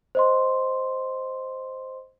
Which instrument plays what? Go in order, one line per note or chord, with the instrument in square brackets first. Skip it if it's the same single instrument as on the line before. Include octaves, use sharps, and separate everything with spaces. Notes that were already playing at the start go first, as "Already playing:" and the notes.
[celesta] C5 D#5 C6